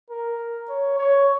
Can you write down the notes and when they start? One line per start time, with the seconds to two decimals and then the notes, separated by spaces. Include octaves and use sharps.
0.10 A#4
0.69 C#5
0.98 C#5